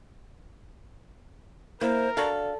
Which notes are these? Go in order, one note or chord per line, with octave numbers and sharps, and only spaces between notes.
A#3 E4 A#4 C5
D4 F#4 A4 D5 F5